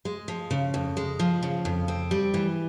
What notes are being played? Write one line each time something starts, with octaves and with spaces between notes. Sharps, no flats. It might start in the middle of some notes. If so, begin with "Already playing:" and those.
G#3
F3
C#3
F2
G#3
F3
C#3
F2
C4
G3
E3